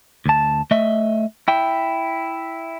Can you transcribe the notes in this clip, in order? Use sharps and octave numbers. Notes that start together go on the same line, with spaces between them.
D2 A5
A3 D#5 E5
E4 G5